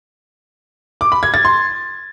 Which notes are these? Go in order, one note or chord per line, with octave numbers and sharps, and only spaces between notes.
D6
B5
G#6
A6
C6